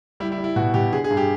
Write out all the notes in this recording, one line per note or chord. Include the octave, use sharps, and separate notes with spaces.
G3 E4
E4
G3
E4
B2 F#4
B2 G4
D3 G#4
G#4
G2
G4